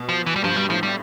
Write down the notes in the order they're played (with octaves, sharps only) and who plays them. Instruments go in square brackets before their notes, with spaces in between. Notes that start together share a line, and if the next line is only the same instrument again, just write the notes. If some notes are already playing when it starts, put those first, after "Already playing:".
Already playing: [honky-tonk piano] B2
[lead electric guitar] F3
E3
G3
[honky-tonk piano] G2 [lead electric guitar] F3
[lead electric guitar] G3
[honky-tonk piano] A2 [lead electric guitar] F3
[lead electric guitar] G3